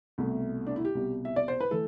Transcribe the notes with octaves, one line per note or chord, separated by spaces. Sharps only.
C2 B2 A3
D4
E4
G4
C2 B2 G3
E5
D5
C5
B4
E3 A3 A4